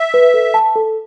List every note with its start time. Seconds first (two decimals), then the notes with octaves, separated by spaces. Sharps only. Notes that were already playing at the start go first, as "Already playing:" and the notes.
Already playing: E5
0.14 B4
0.34 A4
0.54 A5
0.76 A4